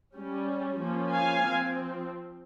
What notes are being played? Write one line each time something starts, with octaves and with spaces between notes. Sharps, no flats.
G3 C#4
F3 A#3 C#4
F5 G#5
F3 C4